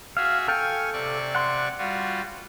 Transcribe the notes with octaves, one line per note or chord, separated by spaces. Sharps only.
F#4 G#4 E5 F5
A4 F5 G5 G#5 C#6
C3 D5 C#6
F#5 C6
G3 F4 F#4